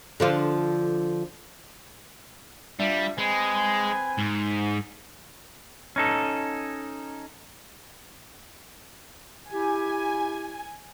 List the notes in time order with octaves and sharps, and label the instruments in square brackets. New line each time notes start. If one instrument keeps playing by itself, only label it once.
[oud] D3 F3 F4
[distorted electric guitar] G3 [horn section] D4 F4 E5
[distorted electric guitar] G#3 [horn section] C4 B4 G#5
[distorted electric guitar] G#2
[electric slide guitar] C#4 D#4 A4
[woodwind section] E4 G4 [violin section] G#5